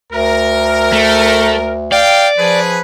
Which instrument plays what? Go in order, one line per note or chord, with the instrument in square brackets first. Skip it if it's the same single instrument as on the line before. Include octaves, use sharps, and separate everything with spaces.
[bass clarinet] D2 [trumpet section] A#4
[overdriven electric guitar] A3
[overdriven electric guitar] D5 [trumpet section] F5 G5
[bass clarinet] F3 [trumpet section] C#4 G#4 B4